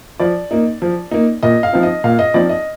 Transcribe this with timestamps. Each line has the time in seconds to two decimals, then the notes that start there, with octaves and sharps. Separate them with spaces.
0.20 F3 D5
0.51 A#3 D#4
0.82 F3
1.11 A#3 D#4
1.43 A#2 D#5
1.63 F5
1.73 F3 C4 D#4
1.83 D#5
2.04 A#2 F5
2.19 D#5
2.34 F3 C4 D#4 D5
2.49 D#5